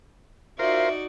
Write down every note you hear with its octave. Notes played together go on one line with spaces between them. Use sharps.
D#4 F4 F#4 A#4 C5 D5 E5